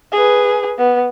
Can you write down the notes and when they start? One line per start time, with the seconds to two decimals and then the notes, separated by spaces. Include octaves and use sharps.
0.12 G#4 B4
0.78 B3